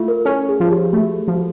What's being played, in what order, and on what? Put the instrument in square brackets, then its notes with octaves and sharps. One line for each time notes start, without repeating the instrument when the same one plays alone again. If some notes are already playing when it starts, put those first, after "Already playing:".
Already playing: [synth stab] A3 [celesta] E4 F4
[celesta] A#4
[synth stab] C#4 [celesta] A4
[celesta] G#4
[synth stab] F3
[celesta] G4
[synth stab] A3 [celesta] F#4
[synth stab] F3 [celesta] F#4